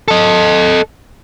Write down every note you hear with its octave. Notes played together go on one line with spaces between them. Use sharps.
A4 D#5